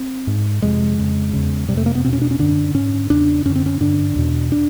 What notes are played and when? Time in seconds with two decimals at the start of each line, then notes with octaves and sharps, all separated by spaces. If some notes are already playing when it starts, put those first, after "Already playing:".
Already playing: C4
0.27 G#2
0.62 F2 C3 G#3
0.98 F2 C#3
1.33 E2 C#3
1.69 F2 C3 G3
1.77 A3
1.86 A#3
1.95 B3
2.04 E2 B2 C4
2.13 C#4
2.22 D4
2.31 C#4
2.39 F#2 D3 D4
2.74 G#2 C#4
3.10 E2 C#3 D4
3.45 F#2 D3 C#4
3.56 C4
3.66 C#4
3.80 G2 D3 D4
4.16 E2 B2
4.52 D4